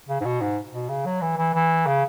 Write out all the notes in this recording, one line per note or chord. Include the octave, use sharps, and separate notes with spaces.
C#3
G#2
B2
G#2
B2
C#3
F#3
E3
E3
E3
C#3